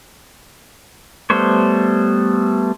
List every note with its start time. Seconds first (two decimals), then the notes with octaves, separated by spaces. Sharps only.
1.30 G3 A3 B3 C5 C#5